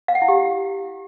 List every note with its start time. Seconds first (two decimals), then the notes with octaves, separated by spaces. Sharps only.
0.08 F5
0.15 F#5
0.22 E4
0.28 G4